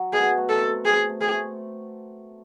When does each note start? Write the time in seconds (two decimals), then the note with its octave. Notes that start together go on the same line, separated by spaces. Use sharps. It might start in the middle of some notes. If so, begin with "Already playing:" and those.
Already playing: F#3
0.13 B2 G#4
0.37 A3
0.49 A4
0.62 C4
0.85 A3 G#4
1.09 A3
1.21 G#4
1.34 A3